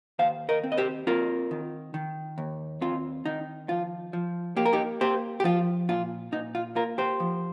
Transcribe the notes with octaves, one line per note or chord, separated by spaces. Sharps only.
D#2 C5 F5
A#4 D#5
C4
D#5
G4 C5
C4 F4 A#4
D#3
D#3
D#2
C4 F4
D#3 D#4
F3 F4
F3
A#3 G4
A#4
D#4 G4
A#3 G4 C5
G4
F3 F4
A#2 F4
A#2 D#4
F4
A#3 F4 A#4
G4 C5
F3